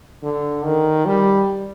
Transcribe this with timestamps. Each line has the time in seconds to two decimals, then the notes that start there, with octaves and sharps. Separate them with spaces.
0.23 D3
0.64 D#3
1.06 G3